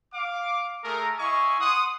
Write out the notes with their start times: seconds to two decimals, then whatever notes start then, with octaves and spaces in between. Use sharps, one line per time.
0.13 F5 D6
0.84 A3 G#4 A#4
1.18 E4 D#5 F5 G#5 C#6
1.61 F#5 C6 D#6